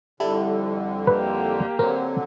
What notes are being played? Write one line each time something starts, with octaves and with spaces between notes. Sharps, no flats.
F2 D3 G3 E4 A4
A#3 G4 B4
D3 F#3 C4 A#4